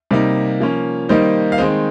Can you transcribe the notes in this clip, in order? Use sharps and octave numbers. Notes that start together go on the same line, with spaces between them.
C3 G3 A#3 D#4
F3 A#3 C#4
D#3 G3 A#3 D#4 C5 D#5
F5
D#3 G#3 C4 C5 D#5